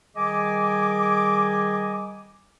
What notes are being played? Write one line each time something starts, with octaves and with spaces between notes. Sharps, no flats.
D#3 G3 G#4 D#5 G#5 D6